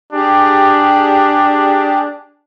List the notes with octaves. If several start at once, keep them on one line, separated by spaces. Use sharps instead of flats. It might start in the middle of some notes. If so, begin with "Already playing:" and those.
D4 G4 G#4